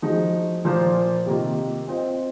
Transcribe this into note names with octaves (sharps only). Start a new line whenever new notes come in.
F3 G#3 D#4 F#4
A#2 F3 A#3 F4 C5
C3 D#3 A#3 F4
C4 F4 C5 D#5